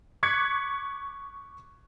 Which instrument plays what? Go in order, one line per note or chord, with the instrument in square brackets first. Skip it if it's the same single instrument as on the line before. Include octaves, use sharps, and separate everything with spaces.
[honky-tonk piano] C#6 D6 F#6 G#6 B6 C#7